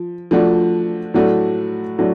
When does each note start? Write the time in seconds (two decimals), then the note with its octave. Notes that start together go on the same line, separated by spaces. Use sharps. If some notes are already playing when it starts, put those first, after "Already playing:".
Already playing: F3
0.31 F3 A3 D4 F#4
1.14 A2 F#3 A3 D4 F#4
1.98 A2 F#3 A3 D4 F#4